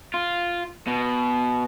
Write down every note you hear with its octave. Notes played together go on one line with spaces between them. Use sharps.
F4
B2